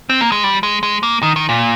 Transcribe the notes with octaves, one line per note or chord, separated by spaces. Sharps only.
C4
A#3
G#3
G3
G#3
G#3
A#3
D#3
D#3
A#2